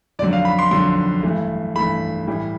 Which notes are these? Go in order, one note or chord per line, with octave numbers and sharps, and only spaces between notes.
F2 D3 F#3 D5
F5
B5
C6
F2 D3 F#3 C6
G2 E3 A3
G2 E3 A3 B5
A2 E3 G3